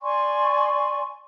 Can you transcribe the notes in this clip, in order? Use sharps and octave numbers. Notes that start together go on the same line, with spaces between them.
D5 G#5 C6 C#6